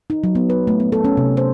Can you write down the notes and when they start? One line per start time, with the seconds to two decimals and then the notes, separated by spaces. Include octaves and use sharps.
0.10 D#4
0.24 F#3
0.35 B3
0.50 B4
0.67 A3
0.80 B3
0.92 A4
1.04 C#4
1.17 C3
1.37 C5